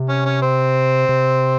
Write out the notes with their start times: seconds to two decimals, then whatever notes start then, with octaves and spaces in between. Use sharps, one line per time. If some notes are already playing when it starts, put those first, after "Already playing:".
Already playing: C3
0.09 C#4
0.25 C#4
0.42 C4
1.09 C3